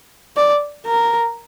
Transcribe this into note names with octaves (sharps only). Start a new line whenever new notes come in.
D5
A#4